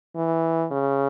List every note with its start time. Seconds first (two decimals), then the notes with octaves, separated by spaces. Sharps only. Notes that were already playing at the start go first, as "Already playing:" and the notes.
0.16 E3
0.71 C#3